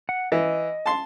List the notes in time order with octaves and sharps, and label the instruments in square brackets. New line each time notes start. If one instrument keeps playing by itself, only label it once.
[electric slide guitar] F#5
[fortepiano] E3 [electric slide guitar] D#5
[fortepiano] A5 C6